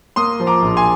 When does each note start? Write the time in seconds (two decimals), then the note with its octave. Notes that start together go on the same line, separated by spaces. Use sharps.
0.16 A#3 C6 D#6
0.40 F3
0.47 A#5 D6
0.62 A#1
0.77 G#5 C6